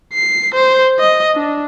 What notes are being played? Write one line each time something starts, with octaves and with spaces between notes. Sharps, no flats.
C7
C5
D#5
D4